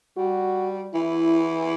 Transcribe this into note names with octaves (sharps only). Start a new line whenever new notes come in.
G3 F#4
E3 E4